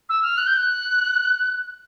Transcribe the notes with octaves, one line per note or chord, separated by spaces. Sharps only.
E6
F6
F#6
G6
F#6